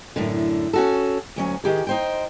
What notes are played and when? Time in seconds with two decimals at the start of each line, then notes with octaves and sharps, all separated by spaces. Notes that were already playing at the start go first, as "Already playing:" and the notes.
0.16 F#2 A2 D3
0.73 C#4 F#4 A4
1.36 D2 F#3 C#4
1.64 D#3 G4 G#4
1.87 D#4 C5 G5